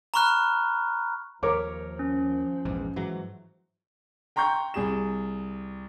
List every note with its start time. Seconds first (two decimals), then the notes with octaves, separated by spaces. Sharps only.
0.14 A#5 B5 C#6 F6 F#6
1.43 D#2 F3 A#4 C#5 D6
1.99 C#4
2.65 A#1 E2 G#2
2.96 G#2 E3 F#3
4.36 G5 A#5 C6 C#6 G6
4.74 C2 G#4 E7